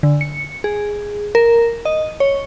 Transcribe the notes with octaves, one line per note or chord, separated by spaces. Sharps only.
D3
C#7
G#4
A#4
D#5
C#5